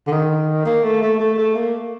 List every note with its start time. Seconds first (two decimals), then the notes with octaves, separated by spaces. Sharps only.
0.07 D3
0.12 D#3
0.66 A#3
0.83 A3
1.02 A3
1.20 A3
1.38 A3
1.55 A#3